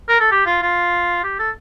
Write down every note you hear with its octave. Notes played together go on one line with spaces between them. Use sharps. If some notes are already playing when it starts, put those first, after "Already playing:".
A#4
A4
G4
F4
F4
G4
A4